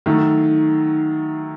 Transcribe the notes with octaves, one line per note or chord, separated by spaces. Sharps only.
D#3 F#3 A3